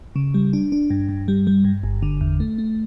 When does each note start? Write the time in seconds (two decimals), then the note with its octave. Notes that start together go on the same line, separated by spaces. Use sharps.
0.16 C#3
0.34 G3
0.53 D4
0.72 D4
0.90 G2
1.09 G2
1.28 G3
1.47 G3
1.64 G2
1.84 G1
2.03 D3
2.21 E2
2.40 A3
2.58 A3